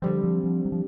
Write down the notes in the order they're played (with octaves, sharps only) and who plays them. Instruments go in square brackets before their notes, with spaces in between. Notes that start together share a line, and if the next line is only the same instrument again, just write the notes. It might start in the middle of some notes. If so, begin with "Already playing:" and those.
[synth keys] D3 G3 C4 [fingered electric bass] F3
[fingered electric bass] F3
F3
F#3
F3